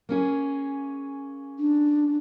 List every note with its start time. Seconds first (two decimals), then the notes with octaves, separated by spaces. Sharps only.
0.09 A#3 C#4 G#4
1.59 D4